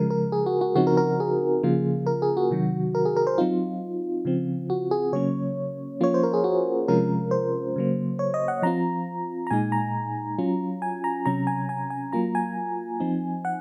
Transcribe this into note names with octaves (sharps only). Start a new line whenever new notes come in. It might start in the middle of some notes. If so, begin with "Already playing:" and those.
Already playing: C#3 F3 G#3 A#4
A#4
G#4
F#4
F#4
C#3 F3 C4 D#4 F#4
A#4
A#4
G#4
C#3 F3 A#3 F4
A#4
G#4
F#4
C3 D#3 F#3
A#4
G#4
A#4
C5
F#3 C4 D#4 F4
C#3 F3 C4
F#4
G#4
C#3 F#3 A#3 C#4 C#5
F3 A#3 C#4 F4 C#5
C5
A#4
G#4
F#4
C3 F3 G#3 C#4 F4 A#4
C5
C#3 F#3 A#3
C#5
D#5
F#5
F3 C4 F4 A#5
A#5
A#2 G#3 D#4 G#5
A#5
F#3 C#4 F4
G#5
A#5
C3 F#3 C#4 A#5
G#5
G#5
G#5
F#3 A#3 F4 A#5
G#5
F3 C4 D#4
F#5